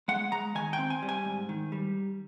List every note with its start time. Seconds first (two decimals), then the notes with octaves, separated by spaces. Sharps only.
0.08 G#3 F#5
0.32 G#3 A#5
0.55 D#3 G#5
0.73 G5
0.79 C4
0.90 G#5
1.02 G3
1.09 G#5
1.25 G#2
1.49 D#3
1.72 G3